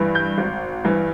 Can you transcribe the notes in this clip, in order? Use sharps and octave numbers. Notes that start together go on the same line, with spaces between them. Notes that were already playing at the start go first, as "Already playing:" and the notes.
Already playing: G2 E3
G6
G#1
G2 E3